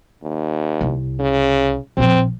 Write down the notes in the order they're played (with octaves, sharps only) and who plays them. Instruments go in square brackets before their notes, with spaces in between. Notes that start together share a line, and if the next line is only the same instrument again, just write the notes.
[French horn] D#2
[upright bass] C2
[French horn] C#3
[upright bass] A#1 F3 [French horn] C4